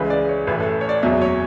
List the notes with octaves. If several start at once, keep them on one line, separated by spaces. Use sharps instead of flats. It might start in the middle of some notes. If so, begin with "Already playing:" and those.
Already playing: C#2 C#3 E3 G#3 B4
D5
C#5
A1 A2 E3 B4
A4
C#5
D5
F#1 E2 B2 F#3 E5
C#5